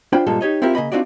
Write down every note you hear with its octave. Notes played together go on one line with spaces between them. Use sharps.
D4 F4 C5 G5 B5
G2 A#2 F3 G3 G#3 A4
D#4 G4 C#5 D#5
C4 E4 F4 G4 A#4
C#3 A#3 D#5 B5
C4 D4 D#4 F4 F#4 D5